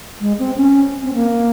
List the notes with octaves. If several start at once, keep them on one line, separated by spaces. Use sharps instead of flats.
G#3
C4
C#4
C4
A#3